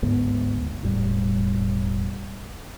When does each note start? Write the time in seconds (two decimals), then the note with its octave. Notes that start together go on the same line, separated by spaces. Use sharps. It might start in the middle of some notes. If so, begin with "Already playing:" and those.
0.02 G1 D2 G#2 B3
0.83 E1 A2 G3